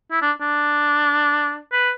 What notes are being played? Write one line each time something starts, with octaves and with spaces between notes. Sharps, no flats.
E4
D4
D4
B4